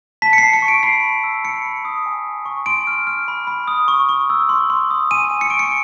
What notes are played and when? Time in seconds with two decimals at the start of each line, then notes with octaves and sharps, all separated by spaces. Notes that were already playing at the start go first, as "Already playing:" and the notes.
0.22 A5 B6
0.33 C#7
0.38 A5 C7
0.53 C#7
0.62 C#6
0.68 D7
0.83 B5 C7
1.03 B5
1.24 E6
1.44 B5 C#7
1.65 B5
1.85 D#6
2.06 G#5
2.26 G#5
2.46 C#6
2.66 C6 D7
2.87 F6
3.07 F6
3.28 B5
3.47 B5
3.68 D#6
3.88 C#6
4.09 C#6
4.30 E6
4.49 C6
4.70 C6
4.91 D#6
5.11 G#5 D#7
5.31 G#5
5.41 C#7
5.50 C#6 D7
5.59 C#7